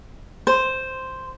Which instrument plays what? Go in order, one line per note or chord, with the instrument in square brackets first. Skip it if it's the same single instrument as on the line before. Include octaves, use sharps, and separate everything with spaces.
[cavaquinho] C5